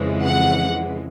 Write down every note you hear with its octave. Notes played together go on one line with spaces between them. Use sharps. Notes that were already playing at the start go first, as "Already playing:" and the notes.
Already playing: F2 C#3 E3 G#3
F#5